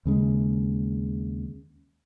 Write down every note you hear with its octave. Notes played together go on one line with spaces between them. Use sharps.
D#2 C#3 G#3